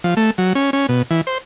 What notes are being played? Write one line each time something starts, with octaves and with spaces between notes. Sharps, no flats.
F3
A3
F#3
C#4
C#4
B2
E3
C5